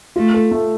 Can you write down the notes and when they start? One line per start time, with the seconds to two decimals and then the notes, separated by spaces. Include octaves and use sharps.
0.16 A3 F4
0.34 A4
0.51 A3